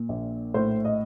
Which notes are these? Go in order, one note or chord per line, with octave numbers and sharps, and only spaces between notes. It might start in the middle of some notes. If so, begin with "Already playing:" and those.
Already playing: A#2
A#1
A2 C5
D#5